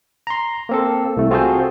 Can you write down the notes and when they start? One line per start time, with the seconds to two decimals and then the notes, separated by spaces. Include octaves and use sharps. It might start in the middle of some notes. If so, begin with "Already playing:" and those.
0.27 A#5 C6
0.69 A#3 C4 A4
1.17 C2 A3
1.30 C4 F4 F#4 G#4 A4 C5